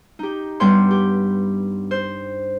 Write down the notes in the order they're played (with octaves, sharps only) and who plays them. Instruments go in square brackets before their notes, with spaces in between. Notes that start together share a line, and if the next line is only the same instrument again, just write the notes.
[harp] D#4 G4
G2 G3 B3 C#5 G5 C6
G4
C5